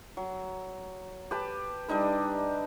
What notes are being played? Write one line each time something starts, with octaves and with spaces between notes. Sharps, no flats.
F#3
G4 B4 A5
G3 D4 D#4 B4